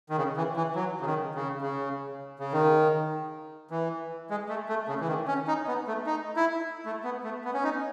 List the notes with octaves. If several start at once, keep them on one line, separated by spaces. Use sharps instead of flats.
D#3
C#3
E3
E3
F#3
C#3
D#3
C#3
C#3
C#3
D#3
E3
G#3
A3
A3
C#3
E3
D#3
C#4
D#4
B3
A3
D#4
E4
A3
B3
A3
B3
C#4
D#4